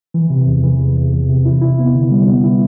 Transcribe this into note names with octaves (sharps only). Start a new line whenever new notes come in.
E3
C3
E2
E3
E2
E2
E2
C3
E4
E4
B3
D3
G3
B3
E4